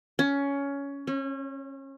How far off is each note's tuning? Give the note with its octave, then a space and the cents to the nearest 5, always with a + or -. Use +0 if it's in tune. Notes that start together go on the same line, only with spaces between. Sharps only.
C#4 +15
C#4 -30